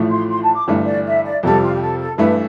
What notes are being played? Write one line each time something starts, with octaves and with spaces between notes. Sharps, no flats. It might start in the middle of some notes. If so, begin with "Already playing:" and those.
Already playing: A1 A2 F3 A3
C6
C6
A5
D6
G1 G2 E3 A3
D5
E5
D5
F2 C3 G3 A4
F4
G4
A4
A4
G2 E3 A3 E4 B4